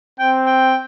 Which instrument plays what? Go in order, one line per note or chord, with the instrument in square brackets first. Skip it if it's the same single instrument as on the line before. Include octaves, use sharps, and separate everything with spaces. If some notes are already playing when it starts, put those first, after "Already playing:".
[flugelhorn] C4 [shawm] G5
[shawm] G5